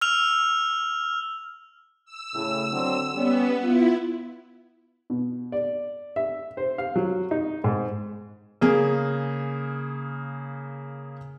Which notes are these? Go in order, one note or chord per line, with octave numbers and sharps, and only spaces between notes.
E6 F6 F7
E6
A2 C#3
D3 F#3 C4
G3 B3 C#4
E4 F4
B2
D5
E5
C5
F5
F#3
D#4
G#2
C#3 A#3 G#4